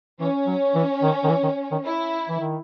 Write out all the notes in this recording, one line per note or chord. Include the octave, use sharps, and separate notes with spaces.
E3 C#4
F#3
E3
D#3
D#3
E3
D#3
D#3
E4
E3
D#3